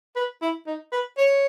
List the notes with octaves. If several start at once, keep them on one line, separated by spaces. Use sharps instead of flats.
B4
E4
D#4
B4
C#5